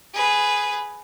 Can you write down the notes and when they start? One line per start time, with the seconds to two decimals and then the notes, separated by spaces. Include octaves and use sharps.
0.14 G#4 B4